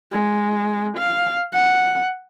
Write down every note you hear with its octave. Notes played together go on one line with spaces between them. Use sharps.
G#3
F5
F#5